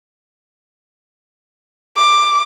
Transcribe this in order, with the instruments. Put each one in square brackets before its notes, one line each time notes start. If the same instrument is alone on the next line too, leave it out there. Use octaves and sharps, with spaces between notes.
[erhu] D6